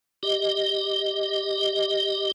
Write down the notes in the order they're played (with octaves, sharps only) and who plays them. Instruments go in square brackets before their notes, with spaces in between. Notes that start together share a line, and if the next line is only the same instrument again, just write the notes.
[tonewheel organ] G4 D#5